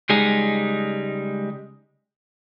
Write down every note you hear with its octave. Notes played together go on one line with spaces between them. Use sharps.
C#2 G3 G#3 D#4 G#4